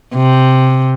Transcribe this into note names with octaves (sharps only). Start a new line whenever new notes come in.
C3